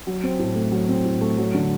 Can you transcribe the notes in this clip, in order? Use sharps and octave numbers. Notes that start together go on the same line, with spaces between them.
F#3
C4
A2
A3
F#3
C4
A2
A3
F#3
D3